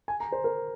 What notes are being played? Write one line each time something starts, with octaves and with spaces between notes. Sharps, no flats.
G#5
A#5
C5
A#4